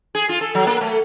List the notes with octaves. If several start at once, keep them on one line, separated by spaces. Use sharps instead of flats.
G#4
F4
A4
F#3
A#3
A3